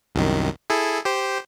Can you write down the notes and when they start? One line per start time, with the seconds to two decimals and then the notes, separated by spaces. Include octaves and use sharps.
0.15 C2 F#2 D#3
0.70 E4 G#4 A4
1.05 G4 C5